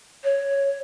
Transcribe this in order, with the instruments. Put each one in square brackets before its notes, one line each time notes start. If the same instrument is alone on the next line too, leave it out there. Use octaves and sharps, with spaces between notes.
[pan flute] C#5